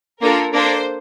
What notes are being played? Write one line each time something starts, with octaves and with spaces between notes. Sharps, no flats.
A#3 D4 F4 A4 A#4
A#3 D4 A4 C5